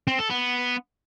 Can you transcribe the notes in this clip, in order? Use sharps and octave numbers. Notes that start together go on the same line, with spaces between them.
C4
A4
B3